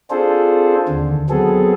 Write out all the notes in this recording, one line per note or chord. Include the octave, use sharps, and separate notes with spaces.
C4 D4 F4 G#4 A4 C5
D#2 D3
F#3 B3 C4 G#4 A4